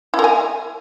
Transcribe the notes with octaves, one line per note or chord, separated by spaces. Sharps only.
E4
A#4
G#5